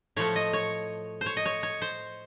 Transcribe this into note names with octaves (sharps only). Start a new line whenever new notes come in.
A2 F3 A3 C#5
D#5
C#5
C5
C#5
D#5
C#5
C#5
C5